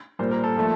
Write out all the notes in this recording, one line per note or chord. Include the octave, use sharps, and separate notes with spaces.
A#2 G3 A#3 C5
A#4
A4
A#2 F3 A3